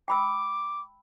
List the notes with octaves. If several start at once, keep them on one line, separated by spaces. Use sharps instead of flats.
G5 B5 D6 E6